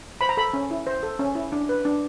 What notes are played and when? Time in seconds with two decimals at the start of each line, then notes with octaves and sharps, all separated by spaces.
0.21 C5 B5
0.29 A#5
0.37 A4 B5
0.54 C#4
0.71 E4
0.87 C5
1.03 A4
1.19 C#4
1.35 E4
1.52 D4
1.69 B4
1.85 D4